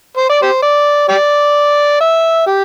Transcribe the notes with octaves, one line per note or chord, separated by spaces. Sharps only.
C5
D5
G4 C5
D5
G4 D5
E5
G4